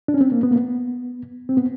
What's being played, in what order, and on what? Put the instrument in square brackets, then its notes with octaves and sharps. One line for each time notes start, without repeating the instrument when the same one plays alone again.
[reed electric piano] D4
C#4
C4
A#3
B3
A#3
B3
C4
B3